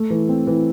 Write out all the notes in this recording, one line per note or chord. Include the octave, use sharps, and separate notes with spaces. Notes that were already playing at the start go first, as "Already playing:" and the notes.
Already playing: A3
E3
C4
E3